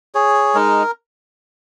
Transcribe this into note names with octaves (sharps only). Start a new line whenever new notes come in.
G#4 C#5
G#3 D#4 A#4